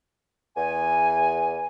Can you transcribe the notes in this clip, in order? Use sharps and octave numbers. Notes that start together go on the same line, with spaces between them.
E2 G#5